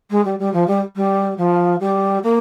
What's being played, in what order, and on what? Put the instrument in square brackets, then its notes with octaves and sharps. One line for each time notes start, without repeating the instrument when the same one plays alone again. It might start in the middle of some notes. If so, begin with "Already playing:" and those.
[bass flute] G#3
G3
G3
F3
G3
G3
F3
G3
A#3